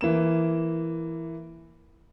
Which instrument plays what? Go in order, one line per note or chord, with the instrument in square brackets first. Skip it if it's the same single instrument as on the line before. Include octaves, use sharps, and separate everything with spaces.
[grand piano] E3 A#3 E7